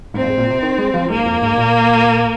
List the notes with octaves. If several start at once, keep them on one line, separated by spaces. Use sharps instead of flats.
G#2 C4
F2
G#2
A#2
C3
D#3
G#3
F3
G#2 A#3
F2
G#2
A#2